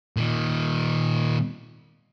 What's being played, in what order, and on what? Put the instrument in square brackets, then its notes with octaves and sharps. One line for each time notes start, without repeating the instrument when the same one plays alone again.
[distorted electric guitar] A#2 D#3